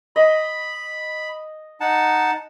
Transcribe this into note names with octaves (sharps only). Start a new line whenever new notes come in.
D#5 B5
D#4 F#5 A5